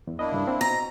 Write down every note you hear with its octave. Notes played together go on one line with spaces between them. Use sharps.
E2
A#3 D4 E4 D#5
C#2 G2
C4
B2 A#5